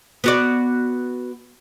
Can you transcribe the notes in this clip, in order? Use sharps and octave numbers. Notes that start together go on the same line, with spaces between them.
B3 F#4 D5